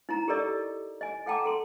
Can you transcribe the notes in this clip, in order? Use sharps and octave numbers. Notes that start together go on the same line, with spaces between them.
D#4 E4 A#5
G4 A4 A#4 D5 D#5 D#6
D#5 G#5
A4 F#5 G5 A5 A#5 D6
A4 C6